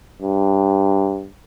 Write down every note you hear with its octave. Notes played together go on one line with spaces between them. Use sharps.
G2